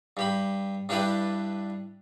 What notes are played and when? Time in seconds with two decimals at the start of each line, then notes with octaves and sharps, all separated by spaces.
0.17 G2 G4 B5
0.89 G2 D4 E4 G4 B4 D5